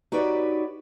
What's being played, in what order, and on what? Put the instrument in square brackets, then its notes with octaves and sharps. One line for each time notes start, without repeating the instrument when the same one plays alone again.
[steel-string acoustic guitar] D#4 F#4 G4 B4 C#5 D5